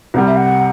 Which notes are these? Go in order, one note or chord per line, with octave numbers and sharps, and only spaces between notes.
C2 C3 G3 F#5
E5
F#5